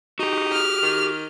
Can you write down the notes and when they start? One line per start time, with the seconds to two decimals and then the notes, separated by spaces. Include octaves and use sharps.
0.19 D#4 F#4 G4
0.52 F6
0.82 D#3